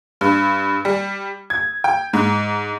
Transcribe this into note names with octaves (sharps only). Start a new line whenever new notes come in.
G2
G3
G#6
G5
G#2